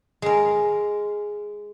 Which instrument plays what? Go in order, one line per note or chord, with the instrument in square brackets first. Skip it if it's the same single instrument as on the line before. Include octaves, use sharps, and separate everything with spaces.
[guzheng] G#3 A#4